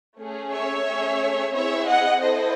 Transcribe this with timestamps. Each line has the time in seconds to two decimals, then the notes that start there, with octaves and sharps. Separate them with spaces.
0.19 A3 C#4 G#4
0.52 C#5 E5
0.87 A3 C#4 G#4
1.54 C4 E4 G#4 C#5 E5
1.88 D#5 F#5
2.22 E4 A4 C5 D#5